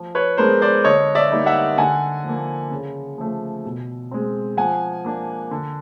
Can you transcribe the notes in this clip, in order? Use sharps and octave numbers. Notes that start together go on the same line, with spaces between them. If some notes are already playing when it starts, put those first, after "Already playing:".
Already playing: F3
B4 C#5
G#3 B3 D4 A#4 C5
C5 D5
D3 C#5 D#5
D5 E5
G3 A#3 D#4
E5 F#5
D3 F#5 G#5
F3
A#3
C#3
F3 A3
B2
G#3 C4
F3 F#5 G#5
A#3 D4
D3